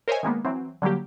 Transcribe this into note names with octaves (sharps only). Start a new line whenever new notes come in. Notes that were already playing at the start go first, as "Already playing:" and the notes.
A#4 C5 C#5 D#5 E5 G#5
D#3 G#3 A#3 B3
E3 F#3 C4
D3 F#3 G3 A#3 G4